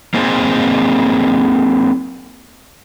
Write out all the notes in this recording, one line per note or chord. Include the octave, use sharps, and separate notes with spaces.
A#3 C4 D#4 G#4 C5